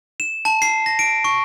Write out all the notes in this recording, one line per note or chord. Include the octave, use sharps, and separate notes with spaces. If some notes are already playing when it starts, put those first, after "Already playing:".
E7
A5
C7
A#6
D7
C#6